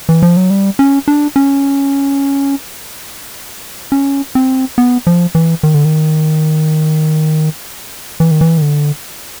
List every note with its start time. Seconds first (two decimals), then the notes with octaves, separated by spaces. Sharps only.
0.09 E3
0.23 F3
0.37 F#3
0.50 G3
0.79 C#4
1.08 D4
1.36 C#4
3.92 C#4
4.35 C4
4.78 B3
5.07 F3
5.35 E3
5.63 D#3
5.74 D3
5.85 D#3
8.20 E3
8.31 D#3
8.41 E3
8.58 D#3
8.62 D3